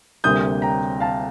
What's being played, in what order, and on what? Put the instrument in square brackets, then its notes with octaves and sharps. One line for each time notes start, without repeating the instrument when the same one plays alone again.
[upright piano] D2 C3 G3 A#3 [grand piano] D#6 G6
[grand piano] G5 A#5
F5 A5